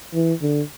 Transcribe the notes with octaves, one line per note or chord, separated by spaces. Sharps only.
E3
D3